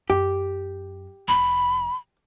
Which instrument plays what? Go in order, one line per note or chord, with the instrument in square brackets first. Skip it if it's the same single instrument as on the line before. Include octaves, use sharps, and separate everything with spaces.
[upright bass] F#2 [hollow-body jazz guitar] G4
[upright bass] F1 F2 [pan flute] B5